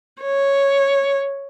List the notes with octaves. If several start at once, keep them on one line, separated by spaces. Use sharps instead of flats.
C#5